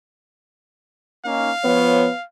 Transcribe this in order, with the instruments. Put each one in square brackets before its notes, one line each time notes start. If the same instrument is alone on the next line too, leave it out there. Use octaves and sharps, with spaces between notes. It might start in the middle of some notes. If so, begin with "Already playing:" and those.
[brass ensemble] A#3 C#4 D#4 [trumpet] F5
[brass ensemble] F3 C#5 [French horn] B3